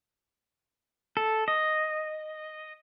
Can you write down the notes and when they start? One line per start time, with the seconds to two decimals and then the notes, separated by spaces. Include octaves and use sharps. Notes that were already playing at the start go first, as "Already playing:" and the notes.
1.17 A4
1.48 D#5